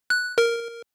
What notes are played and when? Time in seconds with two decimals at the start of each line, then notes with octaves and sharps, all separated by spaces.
0.10 F#6
0.38 A#4